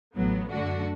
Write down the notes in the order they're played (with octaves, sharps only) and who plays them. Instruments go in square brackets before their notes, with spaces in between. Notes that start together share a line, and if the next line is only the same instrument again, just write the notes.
[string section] A1 A2 F#3 B3
F#2 D3 A3 D4 F#4